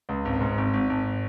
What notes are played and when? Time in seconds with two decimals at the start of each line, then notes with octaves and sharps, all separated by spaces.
0.09 C#2
0.25 G#1
0.41 G#2
0.58 G#1
0.73 G#1
0.90 G#1